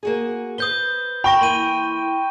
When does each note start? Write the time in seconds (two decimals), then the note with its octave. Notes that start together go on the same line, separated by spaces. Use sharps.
0.03 A#3 F#4 G#4
0.58 B4 C5 D#6 G6 G7
1.24 G5 B5 C#6 A#6
1.41 E3 A#3 C6 D#7